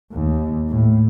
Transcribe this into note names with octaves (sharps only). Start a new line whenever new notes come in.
D#2
A2